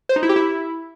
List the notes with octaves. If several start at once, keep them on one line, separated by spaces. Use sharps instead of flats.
C5
D#4
E4
G4
E4